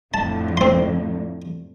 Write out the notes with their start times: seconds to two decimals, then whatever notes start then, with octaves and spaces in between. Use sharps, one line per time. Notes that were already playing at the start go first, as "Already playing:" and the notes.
0.14 F2 A2 D3 A5
0.57 C4 C6